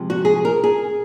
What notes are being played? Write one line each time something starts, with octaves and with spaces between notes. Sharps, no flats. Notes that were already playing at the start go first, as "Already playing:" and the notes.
Already playing: C3 F3 G#3
F#4
G#4
A#4
G#4